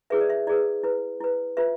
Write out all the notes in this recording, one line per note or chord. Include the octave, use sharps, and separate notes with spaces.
E4 G#4 B4 E5
D5
E5
E4 G#4 B4 D5
E4 B4
E4 B4
F4 B4 E5